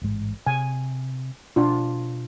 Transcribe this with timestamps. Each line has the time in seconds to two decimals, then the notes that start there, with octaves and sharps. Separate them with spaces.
0.02 A1 G#2 G#3
0.46 C3 G#5
1.56 B2 D4 F4